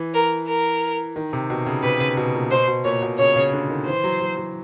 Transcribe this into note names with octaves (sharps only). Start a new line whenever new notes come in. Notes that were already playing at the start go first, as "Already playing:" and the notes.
Already playing: E3
A#4
A#4
D#3
C3
B2
C#3
C3 B4
C#3
B2
A#2
B2 C5
B2
A#2 C#5
B2
C#3 C#5
C#3
D3
D#3
E3 C5
F#3
F#3
F#3